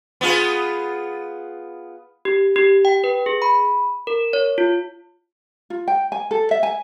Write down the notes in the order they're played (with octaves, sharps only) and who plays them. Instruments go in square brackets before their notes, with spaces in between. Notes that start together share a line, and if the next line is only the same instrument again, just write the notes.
[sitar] B3 F4 G#4
[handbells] G4
G4
G5
B4
G#4
B5
A#4
C#5
F4
[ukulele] F4
G5
G#5
A4
E5
G#5